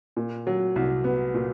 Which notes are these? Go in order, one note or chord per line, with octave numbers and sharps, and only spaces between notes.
A#2
F#3
C2
B3
A#2